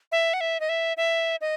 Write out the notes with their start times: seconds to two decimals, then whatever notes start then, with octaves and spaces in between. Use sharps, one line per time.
0.12 E5
0.34 F#5
0.41 E5
0.60 D#5
0.69 E5
0.97 E5
1.41 D#5